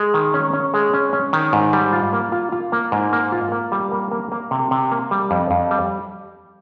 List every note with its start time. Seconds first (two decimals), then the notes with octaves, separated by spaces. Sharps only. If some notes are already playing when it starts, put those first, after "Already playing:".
Already playing: G#3
0.14 D#3
0.34 C#4
0.53 C#4
0.74 G#3
0.94 C#4
1.13 C#4
1.33 D#3
1.53 G#2
1.73 G3
1.93 F4
2.13 A#3
2.32 F4
2.52 F4
2.72 A#3
2.92 G#2
3.13 A#3
3.32 F4
3.52 A#3
3.72 G3
3.92 A#3
4.11 A#3
4.32 A#3
4.51 C3
4.71 C3
4.92 A#3
5.11 G3
5.31 F2
5.51 F2
5.71 G3